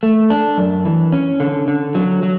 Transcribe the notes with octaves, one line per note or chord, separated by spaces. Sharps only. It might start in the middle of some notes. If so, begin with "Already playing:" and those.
A3
D4
F#2
E3
C#4
D3
D3
F#3
F#3